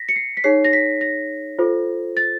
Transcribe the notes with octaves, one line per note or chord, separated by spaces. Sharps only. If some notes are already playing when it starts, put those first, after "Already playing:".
Already playing: A#6 B6
C#7
C7
B6
D#4 G#4 C#5 C7
A#6
B6
A#6
F4 A4 C5
A6